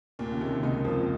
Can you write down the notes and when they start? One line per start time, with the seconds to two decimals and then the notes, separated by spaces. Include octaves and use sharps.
0.19 D#2 A#2
0.32 C#3
0.40 C3 D#3
0.53 C3
0.62 C#2 C#3 D#4
0.85 F2 F3 A#3